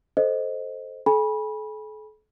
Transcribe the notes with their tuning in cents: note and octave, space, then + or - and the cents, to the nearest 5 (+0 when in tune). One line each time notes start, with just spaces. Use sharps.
A4 -5 C5 +0 D#5 +0
A4 -40 G#5 -20 B5 -25